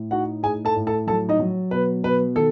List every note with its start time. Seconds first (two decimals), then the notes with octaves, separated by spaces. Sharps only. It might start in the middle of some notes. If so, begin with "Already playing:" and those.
Already playing: A2
0.11 D#4 F#4 F#5
0.43 A2 G#4 G#5
0.65 A4 A5
0.76 A2
0.87 A4 A5
1.07 F#3 A4 A5
1.29 D#4 D#5
1.40 F#3
1.71 B2 B4
2.03 B2 B4
2.36 D#3 A4